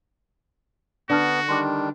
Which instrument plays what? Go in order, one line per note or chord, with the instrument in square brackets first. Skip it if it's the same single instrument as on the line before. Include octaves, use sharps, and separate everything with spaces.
[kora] D3 [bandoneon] B3 [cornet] F#4 [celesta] D5 A5 F6
[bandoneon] D#3 G3 D4 [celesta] C6 D6